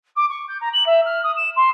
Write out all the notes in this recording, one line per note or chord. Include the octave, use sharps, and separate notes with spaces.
D6
C#6
G6
A#5
F#7
E5
F6
D#6
E7
C6